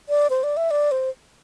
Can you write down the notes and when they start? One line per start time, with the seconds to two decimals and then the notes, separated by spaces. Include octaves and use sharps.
0.09 D5
0.30 C5
0.43 D5
0.57 E5
0.71 D5
0.91 C5